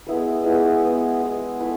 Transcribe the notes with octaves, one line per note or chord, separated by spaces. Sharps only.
G#3 B3 E4 B4
G#3 B3 E4 B4
G#3 B3 E4 B4
G#3 B3 E4 B4
A3 E4 B4